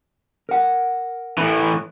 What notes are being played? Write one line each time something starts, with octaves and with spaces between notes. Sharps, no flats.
A#4 F#5
A2 E3